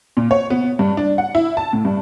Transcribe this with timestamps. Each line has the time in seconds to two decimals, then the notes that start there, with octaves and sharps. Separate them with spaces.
0.17 A#2
0.31 C#5
0.50 B3
0.79 G2
0.97 D4
1.18 F#5
1.35 E4
1.57 A5
1.73 A2
1.85 G2